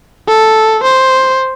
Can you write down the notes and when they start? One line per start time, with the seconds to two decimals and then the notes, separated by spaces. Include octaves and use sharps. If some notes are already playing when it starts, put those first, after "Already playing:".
0.28 A4
0.83 C5